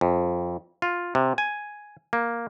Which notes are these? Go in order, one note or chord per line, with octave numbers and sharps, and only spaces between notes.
F2
F4
C3
G#5
A#3